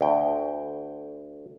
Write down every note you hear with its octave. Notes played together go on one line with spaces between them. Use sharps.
D2 G5